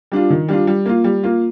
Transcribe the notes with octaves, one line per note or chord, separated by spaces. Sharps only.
G3 D4 F4
D#3
G3 D4 F4
G3
A#3 F4
G3
A#3 F4